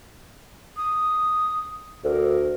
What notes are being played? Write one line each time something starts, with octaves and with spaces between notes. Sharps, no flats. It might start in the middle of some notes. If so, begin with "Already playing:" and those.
D#6
D2 A#4